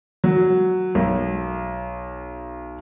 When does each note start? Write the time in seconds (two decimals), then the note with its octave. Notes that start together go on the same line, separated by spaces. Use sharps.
0.24 F#3
0.95 B1